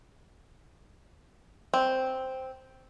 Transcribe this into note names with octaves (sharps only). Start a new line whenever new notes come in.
C4